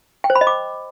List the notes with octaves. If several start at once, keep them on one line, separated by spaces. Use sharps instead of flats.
G5
C5
B5
D#5
D6